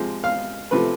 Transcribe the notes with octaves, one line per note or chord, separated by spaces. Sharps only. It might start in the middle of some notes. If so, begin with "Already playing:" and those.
Already playing: C3 F3 G#3
F5
C3 F3 A3 B4